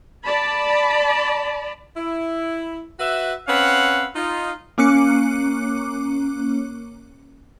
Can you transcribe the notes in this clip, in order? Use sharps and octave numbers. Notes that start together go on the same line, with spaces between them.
D5 A5 B5
E4
F#4 B4 E5
C4 C#4 B4 F5 F#5
D#4 F4
A#3 C#4 D6 F#6 C#7